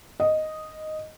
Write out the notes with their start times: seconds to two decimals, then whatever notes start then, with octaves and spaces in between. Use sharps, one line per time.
0.20 D#5